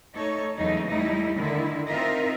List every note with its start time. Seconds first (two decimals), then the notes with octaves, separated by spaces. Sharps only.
0.14 A3 D#4 A4 C#5
0.57 E2 C#3 F#3 A3 D#4
0.87 G3 A3 D#4 E4
1.38 D3 D#3 E4
1.88 C4 D#4 F4 A#4 D#5 E5